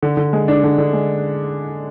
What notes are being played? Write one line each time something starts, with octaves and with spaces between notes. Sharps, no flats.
D3
D3
G#3
D4
D3
D3
G#3